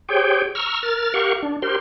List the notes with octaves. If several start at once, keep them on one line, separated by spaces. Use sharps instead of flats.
G4 G#4 C5 C#5 G5
A#5 C#6 E6 F6
A#4 F6 A6
G4 A#4 F5 F#5 C#6
D4
G4 A#4 C5 C6